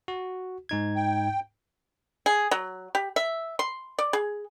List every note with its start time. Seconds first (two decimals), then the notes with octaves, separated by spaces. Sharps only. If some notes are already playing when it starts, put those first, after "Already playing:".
0.08 F#4
0.69 G#2 D#4 G#6
0.95 G5
2.26 G#4
2.51 F#3
2.95 G4
3.16 E5
3.59 C6
3.99 D5
4.13 G#4